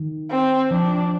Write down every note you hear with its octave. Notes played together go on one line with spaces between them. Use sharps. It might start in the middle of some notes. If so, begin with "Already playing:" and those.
Already playing: D#3
C4
F3 D4